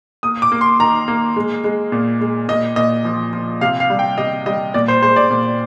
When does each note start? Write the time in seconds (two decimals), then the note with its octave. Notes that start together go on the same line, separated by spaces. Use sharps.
0.23 A#3 D#6
0.42 D6
0.52 A#3
0.61 C6
0.79 D#3 A#5
1.08 A#3
1.36 G#3
1.64 G#3
1.92 A#2
2.21 G#3
2.48 A#2 D#5
2.76 A#2 D#5
3.05 F3
3.33 F3
3.61 C3 F5
3.80 F5
3.90 G3
3.99 G5
4.18 C3 D#5
4.46 G3 D#5
4.74 A#2 D5
4.88 C5
5.02 G#3 C5
5.16 D5
5.31 A#2